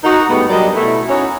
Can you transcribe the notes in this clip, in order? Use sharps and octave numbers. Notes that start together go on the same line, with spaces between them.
D#4 F#4
A2 G3 G#3 B3
F#3 G3 A#3 D4 D5 D#5
B2 A3 E4
C#4 D#4 E4 F#4 C#5